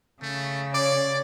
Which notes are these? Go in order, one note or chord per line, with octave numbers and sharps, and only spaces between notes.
C#3 A3
C#5 D5 D6